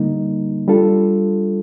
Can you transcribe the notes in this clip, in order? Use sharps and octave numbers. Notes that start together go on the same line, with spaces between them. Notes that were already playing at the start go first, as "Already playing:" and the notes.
Already playing: D3 G3 A#3 D#4
G3 D4 F4 A4